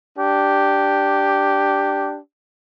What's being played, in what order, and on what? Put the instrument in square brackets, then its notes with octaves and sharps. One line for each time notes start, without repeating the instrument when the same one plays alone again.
[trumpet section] D4 G4